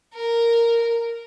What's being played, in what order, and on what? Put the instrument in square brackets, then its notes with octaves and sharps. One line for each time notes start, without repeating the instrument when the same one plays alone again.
[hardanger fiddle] A#4